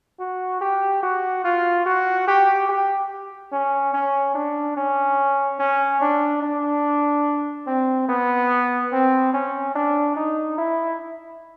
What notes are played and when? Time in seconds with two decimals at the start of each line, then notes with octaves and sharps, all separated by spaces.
0.20 F#4
0.61 G4
1.03 F#4
1.44 F4
1.86 F#4
2.28 G4
2.69 G4
3.52 C#4
3.94 C#4
4.35 D4
4.76 C#4
5.60 C#4
6.01 D4
6.43 D4
7.67 C4
8.09 B3
8.92 C4
9.34 C#4
9.75 D4
10.16 D#4
10.58 E4